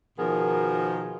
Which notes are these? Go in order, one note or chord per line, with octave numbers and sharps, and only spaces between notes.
B2 D#3 F3 B3 G#4 A#4